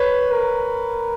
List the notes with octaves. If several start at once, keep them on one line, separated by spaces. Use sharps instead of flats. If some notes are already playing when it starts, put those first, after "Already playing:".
Already playing: B4 C#5
A#4